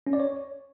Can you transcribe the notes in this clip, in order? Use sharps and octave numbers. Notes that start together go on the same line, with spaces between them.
C#4
D5
C#5